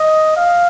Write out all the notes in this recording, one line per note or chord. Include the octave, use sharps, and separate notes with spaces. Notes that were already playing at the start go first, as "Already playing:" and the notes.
Already playing: D#5
F5